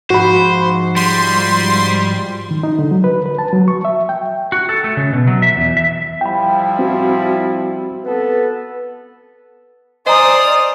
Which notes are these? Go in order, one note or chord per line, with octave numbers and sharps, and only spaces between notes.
G#2 F3 F#4 C5 B5
G3 C6
D#3
D#4
D3
F#3
B4
B4
A5
F#3
C#6
E5
G5
F#4
A4
A3
C#3
B2
F#3
E5
E2
E5
F3 G3 E4 G5 B5
C4 F#4
B3 A4 B4
C5 D5 D#5 G#5 A#5 D#6 F6